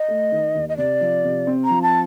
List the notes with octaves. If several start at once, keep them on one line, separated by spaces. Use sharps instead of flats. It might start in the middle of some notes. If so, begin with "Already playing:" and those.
Already playing: D#5
A3
D#3
D#2
D#5
C3 D5
F3
C3
C4
A#5
F3
A5